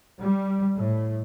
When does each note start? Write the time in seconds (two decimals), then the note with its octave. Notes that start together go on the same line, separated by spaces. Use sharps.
0.21 G3
0.76 A2